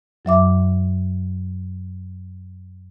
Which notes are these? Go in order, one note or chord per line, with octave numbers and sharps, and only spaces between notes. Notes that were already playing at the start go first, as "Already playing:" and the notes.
F#2 F#3 E5 D6